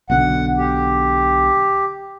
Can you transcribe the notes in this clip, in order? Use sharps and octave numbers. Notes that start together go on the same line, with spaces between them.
B1 B2 D3 F#5
G4